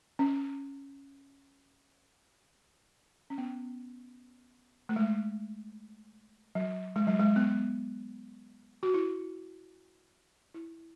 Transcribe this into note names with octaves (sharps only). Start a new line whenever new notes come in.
C#4
C#4
B3
A3
G#3
F#3
G#3
F#3
G#3
B3
F#4
E4
E4